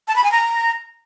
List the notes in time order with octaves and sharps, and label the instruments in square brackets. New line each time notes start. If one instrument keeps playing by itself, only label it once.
[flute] A5
B5
G#5
A#5